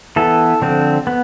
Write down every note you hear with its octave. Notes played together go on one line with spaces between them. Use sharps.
E3 B3 A4
D3 F3 C4
B3